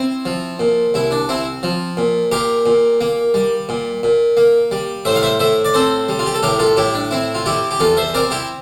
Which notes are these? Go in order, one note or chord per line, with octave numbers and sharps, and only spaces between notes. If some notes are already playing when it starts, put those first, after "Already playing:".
Already playing: C4 E4
F3
A#2
C2 E4
D4
C4 E4
F3
A#2
A#2 G4 A#4
A#2
A#3
G3
A#2
A#2
A#3
G3
A2 C5 E5
F5
C5 E5
A2 C5 E5
D5
C4 A4 C5
G3
F4
G4
A4
A2 G4 A#4
F4 A4
A2 E4 G4
D4
C4 E4
F4
G3 E4 G4
G4
E2 F4 A4
C5 E5
C4 A#4 D5
E4 G4